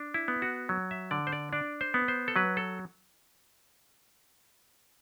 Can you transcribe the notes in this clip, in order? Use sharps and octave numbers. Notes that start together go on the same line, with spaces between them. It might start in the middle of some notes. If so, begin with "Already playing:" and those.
Already playing: D4
E4
B3
F#4
F#3
E5
D3 D5
C5
D5
D4 D5
C5
B3
C5
A4
F#3 B4
A4